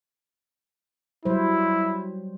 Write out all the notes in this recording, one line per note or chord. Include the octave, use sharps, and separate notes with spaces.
F#3 G3 E4 C5